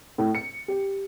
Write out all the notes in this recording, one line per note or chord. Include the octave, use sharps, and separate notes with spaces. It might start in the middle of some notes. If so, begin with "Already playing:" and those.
A2
C#7
G4